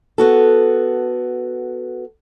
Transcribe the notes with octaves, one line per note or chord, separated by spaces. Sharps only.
B3 F#4 A4